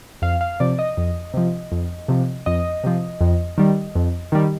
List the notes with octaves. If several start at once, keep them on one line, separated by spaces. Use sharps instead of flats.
F2 F5
F5
C3 F3 D5
D#5
F2
C3 F3
F2
C3 F3
F2 D#5
C3 F3
F2
D#3 G3
F2
D#3 G3